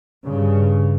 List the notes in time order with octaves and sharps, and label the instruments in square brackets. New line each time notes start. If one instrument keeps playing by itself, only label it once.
[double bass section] G2 C#3